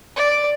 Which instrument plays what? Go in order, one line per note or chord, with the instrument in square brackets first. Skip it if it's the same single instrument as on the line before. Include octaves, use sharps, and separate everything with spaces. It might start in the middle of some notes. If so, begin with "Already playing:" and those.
[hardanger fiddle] D5